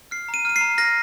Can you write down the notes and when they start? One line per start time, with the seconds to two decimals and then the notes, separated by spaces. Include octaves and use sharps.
0.11 F6 C7
0.29 A#5
0.34 D#7
0.45 F6 D#7
0.56 C7
0.61 A#5
0.78 F6 A#6